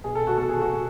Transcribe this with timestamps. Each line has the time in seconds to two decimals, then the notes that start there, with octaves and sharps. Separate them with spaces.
0.04 B2 G#4
0.15 A4
0.27 F#4
0.38 B2 A4
0.49 G#4
0.61 F#4
0.71 B2